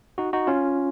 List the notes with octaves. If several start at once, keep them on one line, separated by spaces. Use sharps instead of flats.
D#4 F#4
D#4 F#4
C#4 F4